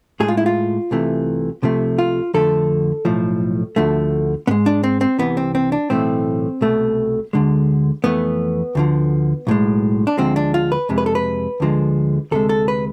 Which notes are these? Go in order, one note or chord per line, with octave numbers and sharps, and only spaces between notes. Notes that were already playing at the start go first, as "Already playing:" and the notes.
A2 G#3 G#4
F4
E4
F4
C2 C3 E3 A3
C2 C3 F3 A3
F4
F2 D3 F3 A3 A4
B1 A2 F3
D2 D3 F3 A3
G#2 G#3 B3
D4
C4
C4
C2 C3 E3 B3
C4
C4
D4
B1 A2 E3 A3 C4
C2 B2 A3
D2 D3 G#3
F2 E3 A3 B3
D2 D3 F3
B1 A2 G#3
D4
D2 D3 F3 G#3 C4
D4
F4
B4
F2 C3 G#3
B4
A4
B4
D2 D3 F3 G#3
D2 C3 G#3 A4
A4
B4